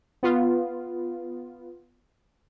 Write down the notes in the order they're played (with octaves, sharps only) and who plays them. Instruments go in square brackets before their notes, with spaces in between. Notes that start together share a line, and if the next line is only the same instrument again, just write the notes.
[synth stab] B3 F4